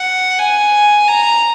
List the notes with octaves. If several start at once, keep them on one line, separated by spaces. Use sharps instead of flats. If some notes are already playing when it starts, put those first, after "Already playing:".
Already playing: F#5
G#5
A#5